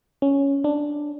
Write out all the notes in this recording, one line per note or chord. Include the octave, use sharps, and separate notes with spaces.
C#4
D4